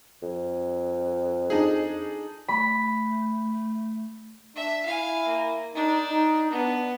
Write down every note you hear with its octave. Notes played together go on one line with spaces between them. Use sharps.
F2
D4 D#4 G#4
A3 B5
D4 E5
E4 F5 G#5
A#3
D4 D#4
D#4
B3 D4